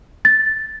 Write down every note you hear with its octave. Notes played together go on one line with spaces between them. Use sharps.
A6